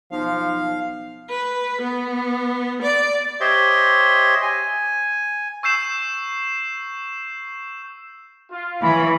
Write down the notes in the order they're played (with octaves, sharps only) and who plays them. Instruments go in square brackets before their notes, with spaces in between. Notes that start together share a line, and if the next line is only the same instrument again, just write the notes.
[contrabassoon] B1 [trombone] F3 [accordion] F5
[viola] B4
B3
D5
[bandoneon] G4 C5 C#5 D#5 E5 C6
G#5
[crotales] C#6 E6 G6 C7 E7
[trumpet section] F4
[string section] E3 [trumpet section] C#4 B5